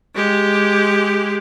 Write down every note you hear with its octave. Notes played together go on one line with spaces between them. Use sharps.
G#3 G4